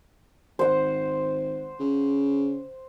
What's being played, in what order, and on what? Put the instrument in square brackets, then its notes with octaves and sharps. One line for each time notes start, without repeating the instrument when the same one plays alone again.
[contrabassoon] G#1 [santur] C5 F#5
[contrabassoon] C#3